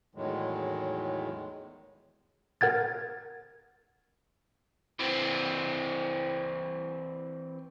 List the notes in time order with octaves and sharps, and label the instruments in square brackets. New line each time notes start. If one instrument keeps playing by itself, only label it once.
[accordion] E2 A2 D#3 F#3 G#3
[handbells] A#4 F#5 G#6 A6
[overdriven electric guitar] E3 C4